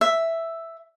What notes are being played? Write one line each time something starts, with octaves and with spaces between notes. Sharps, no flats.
E5